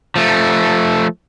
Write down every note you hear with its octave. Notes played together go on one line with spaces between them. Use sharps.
F3 A3